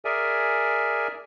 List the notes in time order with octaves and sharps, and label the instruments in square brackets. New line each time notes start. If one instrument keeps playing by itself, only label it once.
[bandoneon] G#4 A#4 D5 E5 G#5